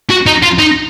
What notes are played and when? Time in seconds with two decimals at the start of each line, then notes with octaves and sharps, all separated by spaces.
0.10 F#4
0.26 D#4
0.43 F4
0.59 D#4